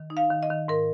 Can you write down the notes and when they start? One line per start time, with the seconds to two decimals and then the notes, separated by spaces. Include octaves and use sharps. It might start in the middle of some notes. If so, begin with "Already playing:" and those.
Already playing: D#3
0.10 D#4
0.17 F5
0.30 D#3
0.43 D#5
0.50 D#3
0.68 G#2 A#4